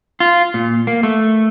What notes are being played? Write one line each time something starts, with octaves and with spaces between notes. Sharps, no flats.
F4
A#2
A#3
A3